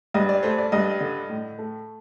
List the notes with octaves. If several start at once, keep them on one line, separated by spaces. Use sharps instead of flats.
G2 D#5
D5
A3 C5
D5
G2 D#5
D3
A2
A3